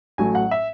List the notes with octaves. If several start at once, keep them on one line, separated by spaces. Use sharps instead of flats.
A1 A2 F#3 A3 G#5
F#5
E5